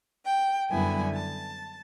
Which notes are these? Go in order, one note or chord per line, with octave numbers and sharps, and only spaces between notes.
G5
F#2 D3 G3 B3 E4 G#5
A5